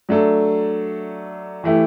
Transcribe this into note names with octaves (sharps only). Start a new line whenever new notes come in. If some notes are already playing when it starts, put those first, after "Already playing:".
F#3 A3 D4 A4
E3 A3 E4 G4